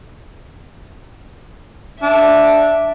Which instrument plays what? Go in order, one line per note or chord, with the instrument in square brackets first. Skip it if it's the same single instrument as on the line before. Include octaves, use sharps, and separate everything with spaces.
[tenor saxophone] D4 [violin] E5